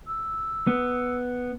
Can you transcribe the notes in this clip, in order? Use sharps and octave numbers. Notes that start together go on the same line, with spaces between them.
E6
B3